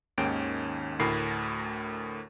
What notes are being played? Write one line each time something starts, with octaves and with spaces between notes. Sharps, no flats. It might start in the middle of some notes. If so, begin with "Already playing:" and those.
D#2 G#2 D#3 C#4 G5 D7
D2 A2 A#4 B5 C7